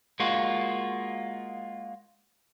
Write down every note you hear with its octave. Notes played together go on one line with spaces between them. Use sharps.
G#3 A#3 F4 F#4